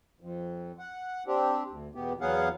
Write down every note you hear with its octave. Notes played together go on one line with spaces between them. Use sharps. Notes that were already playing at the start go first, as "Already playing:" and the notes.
F2
F#5
C4 D4 G4
D2
E2 B2 B3 G4
E2 F#3 B3 G#4 F5 F#5